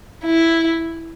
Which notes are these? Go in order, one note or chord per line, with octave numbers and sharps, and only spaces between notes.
E4